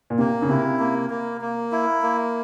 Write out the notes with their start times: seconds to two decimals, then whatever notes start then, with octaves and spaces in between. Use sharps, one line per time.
0.10 A#2
0.18 C3 A#3
0.42 C#3
0.49 C3 E4
0.80 A#3
1.10 A#3
1.41 A#3
1.72 E4
2.02 A#3